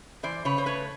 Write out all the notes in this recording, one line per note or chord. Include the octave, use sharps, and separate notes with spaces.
E3 C5 D5
C#3 B4 C#5
C5
A3 B4 C#5